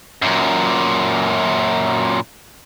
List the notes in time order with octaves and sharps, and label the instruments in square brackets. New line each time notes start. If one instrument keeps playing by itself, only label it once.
[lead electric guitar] F#2 A#2